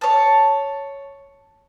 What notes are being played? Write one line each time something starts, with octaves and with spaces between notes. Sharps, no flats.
C#5 A5